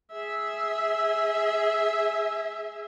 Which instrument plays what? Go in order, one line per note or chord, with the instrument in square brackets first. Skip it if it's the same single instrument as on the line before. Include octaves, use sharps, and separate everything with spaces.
[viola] G#4 E5